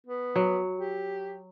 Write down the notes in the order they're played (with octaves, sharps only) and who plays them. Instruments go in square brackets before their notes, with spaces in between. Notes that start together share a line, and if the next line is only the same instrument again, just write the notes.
[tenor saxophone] B3
[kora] F#3
[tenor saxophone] G4